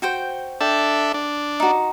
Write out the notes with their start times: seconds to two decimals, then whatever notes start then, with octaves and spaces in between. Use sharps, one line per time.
0.02 F#4 C5 G5
0.61 D4 A4 E5 G5
1.14 D4
1.60 D#4 F#4